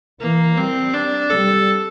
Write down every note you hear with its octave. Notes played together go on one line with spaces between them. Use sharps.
E3 A#3
G3 C4
D4
G3 A4